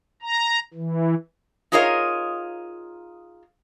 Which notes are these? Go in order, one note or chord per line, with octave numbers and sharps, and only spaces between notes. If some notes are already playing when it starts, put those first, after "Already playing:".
A#5
E3
D#4 F4 G#4 A#4 C#5 D#5